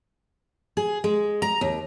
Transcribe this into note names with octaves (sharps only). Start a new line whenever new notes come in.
G#4
G#3
A#5
D#2